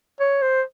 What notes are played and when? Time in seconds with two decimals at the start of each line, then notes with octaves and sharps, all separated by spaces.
0.20 C#5
0.42 C5